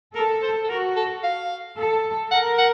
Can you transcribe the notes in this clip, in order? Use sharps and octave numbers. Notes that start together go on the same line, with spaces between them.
A4 A#4
C5
A4
F#4 A#4
A4
F5
A4
A#4 F#5
F#5